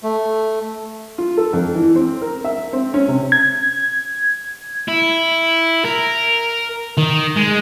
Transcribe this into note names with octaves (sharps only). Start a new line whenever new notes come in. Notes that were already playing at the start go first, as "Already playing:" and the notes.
A3
F4
A4
F2
E3
C4
A#4
E5
C4
C#4
C3
G#6
E4
A#4
D#3
G#3